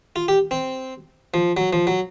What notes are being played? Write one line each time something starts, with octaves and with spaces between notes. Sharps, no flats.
F4
G4
C4
F3
F#3
F3
F#3